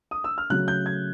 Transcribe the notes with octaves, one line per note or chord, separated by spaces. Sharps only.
D#6
E6
F6
C#3 F#3 A3 F#6
G6
G#6